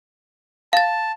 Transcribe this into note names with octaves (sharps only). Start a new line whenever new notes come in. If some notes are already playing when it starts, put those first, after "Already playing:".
F5 A5 A6